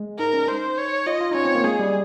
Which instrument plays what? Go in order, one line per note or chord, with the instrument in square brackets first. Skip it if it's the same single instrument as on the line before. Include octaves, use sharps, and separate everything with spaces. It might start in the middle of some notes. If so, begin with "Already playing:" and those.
Already playing: [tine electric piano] G#3
[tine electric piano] D#4 [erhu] A#4
[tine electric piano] C#4
[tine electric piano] D#4 [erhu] C5
[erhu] C#5
[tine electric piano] F4 [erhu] D#5
[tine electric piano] F4
D#4
[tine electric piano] C#4 [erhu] C#5
[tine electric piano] C4
A#3
[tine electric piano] G#3 [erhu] G#4
[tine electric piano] G3